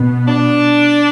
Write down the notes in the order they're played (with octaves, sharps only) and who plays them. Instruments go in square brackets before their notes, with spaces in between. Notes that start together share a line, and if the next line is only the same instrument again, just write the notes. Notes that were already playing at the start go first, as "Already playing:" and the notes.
Already playing: [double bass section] B2 B3
[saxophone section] D4